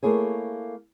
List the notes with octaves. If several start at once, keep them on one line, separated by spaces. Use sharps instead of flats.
A3 A#3 E4 G#4 C#5